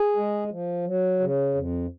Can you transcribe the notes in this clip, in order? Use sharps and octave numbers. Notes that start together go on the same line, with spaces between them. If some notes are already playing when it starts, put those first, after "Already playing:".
Already playing: G#4
G#3
F3
F#3
C#3
F2